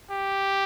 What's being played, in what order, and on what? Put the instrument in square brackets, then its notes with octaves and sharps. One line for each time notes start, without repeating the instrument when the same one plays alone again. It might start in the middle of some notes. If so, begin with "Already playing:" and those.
[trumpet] G4